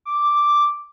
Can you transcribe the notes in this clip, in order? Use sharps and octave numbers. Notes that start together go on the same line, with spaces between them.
D6